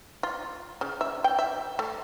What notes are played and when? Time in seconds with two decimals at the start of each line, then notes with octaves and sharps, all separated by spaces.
0.23 F4
0.81 C#3
1.01 E5
1.24 G5
1.39 E5
1.79 A3